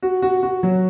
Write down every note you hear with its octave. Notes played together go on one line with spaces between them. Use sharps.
F#4
F#4
F#4
F#3